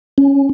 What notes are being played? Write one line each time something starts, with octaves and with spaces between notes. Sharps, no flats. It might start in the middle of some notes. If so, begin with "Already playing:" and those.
C#4